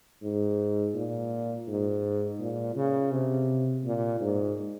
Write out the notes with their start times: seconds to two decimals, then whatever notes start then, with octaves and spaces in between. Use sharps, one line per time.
0.22 G#2
0.94 A#2
1.67 G#2
2.39 A#2
2.76 C#3
3.11 C3
3.84 A#2
4.20 G#2